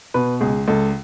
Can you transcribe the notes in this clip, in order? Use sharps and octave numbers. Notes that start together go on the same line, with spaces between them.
B2 B4
C#2 G#4
C#2 A4